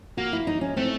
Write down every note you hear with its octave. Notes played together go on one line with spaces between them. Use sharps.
A#3 F#4
E4
D#4
C#4
A3 C4